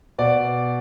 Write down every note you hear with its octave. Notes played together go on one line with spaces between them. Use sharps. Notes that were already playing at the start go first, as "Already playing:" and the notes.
B2 D5